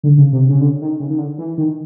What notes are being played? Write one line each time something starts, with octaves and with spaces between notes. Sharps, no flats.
D3
C#3
C3
C#3
D3
D#3
C#3
D#3
D3
E3
D#3